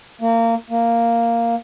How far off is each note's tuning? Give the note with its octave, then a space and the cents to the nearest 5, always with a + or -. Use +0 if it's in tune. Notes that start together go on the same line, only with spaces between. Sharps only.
A#3 -25
A#3 -5